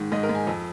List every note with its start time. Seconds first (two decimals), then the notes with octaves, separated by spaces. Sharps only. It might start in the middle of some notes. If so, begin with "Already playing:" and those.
Already playing: G#2 D#3
0.12 G#2 D#5
0.23 A#4
0.29 G#2
0.35 G#5
0.47 F2